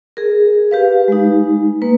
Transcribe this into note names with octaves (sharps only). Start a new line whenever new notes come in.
G#4 A#4
G4 B4 F5
G#3 D#4
A#3 B4